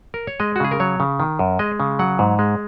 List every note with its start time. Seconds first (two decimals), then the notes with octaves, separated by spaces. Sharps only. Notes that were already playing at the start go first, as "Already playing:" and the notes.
0.14 A#4
0.27 C#5
0.40 G#3 D#5
0.56 F#4
0.60 C#3 G#4
0.71 A#4
0.80 F#3 C#5
1.00 C#3
1.20 D#3
1.39 F#2
1.59 G#3 D#5
1.80 C#3
1.99 F#3 F#5
2.19 G#2
2.39 G#3